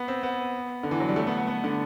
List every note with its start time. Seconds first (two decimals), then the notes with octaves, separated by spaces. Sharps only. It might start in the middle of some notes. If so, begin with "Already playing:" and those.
Already playing: B3
0.08 C4
0.23 B3
0.83 D3
0.91 E3
1.00 F#3
1.09 G3
1.16 A3
1.27 B3
1.37 B3
1.47 B3
1.64 D3